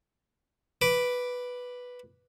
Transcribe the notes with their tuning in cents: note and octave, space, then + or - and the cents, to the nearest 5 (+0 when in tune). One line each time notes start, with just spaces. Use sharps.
B4 +0 D6 +0